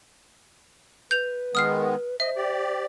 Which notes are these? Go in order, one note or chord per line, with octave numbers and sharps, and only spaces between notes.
B4 G6 F7
D#3 G#3 B3 D#6 F6 C7
C5 D#5 E5
G4 D5